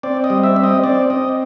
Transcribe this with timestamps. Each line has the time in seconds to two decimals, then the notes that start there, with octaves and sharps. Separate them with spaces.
0.03 C4 D5
0.24 D#5
0.30 G3
0.44 E5
0.56 C4
0.64 D#5
0.84 C4 D5
1.10 C4 D#5